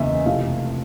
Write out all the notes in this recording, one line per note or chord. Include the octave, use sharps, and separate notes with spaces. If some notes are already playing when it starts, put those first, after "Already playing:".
Already playing: F#1 E2 C#3 E3 D#5 E5
F1 F2 C3 E3 F5